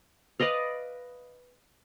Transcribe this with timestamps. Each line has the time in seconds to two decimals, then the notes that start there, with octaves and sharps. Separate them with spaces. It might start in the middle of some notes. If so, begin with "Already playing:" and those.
0.40 B4 D5 D#5 F5